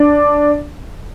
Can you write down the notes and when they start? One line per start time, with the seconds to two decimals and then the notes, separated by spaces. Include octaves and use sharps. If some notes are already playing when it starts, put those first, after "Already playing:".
Already playing: D4